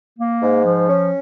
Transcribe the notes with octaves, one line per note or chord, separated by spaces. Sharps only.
A#3
G#2
F3
C#4